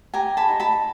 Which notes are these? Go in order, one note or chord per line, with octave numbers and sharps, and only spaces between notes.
G4 G#5 A#5
A5 B5
D#4
A5 B5